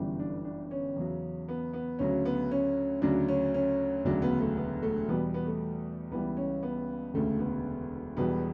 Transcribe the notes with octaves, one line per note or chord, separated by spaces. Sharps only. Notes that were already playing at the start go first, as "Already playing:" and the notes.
Already playing: G1 F#2 E3 G3
D4
D4
C#4
E2 C#3 F#3
B3
B3
D2 C#3 F#3 C#4
B3
C#4
D2 C#3 F#3 D4
C#4
C#4
E1 D2 C#3 F#3 D4
B3
A3
B3
A3
E2 B2 G3 B3
B3
A3
C#2 C#3 E3 G3 B3
C#4
B3
E1 D2 C#3 A3
B3
E1 E2 B2 G3 B3